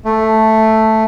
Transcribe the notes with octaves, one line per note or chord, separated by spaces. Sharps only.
A3